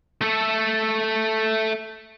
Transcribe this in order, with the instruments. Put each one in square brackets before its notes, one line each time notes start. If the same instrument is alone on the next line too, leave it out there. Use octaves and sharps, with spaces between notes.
[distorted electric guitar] A3 A4